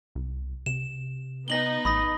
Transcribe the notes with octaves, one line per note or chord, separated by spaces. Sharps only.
C2
C3 E7
B3 D#4 A#6 F#7 G7
A1 B5 D#6 A#6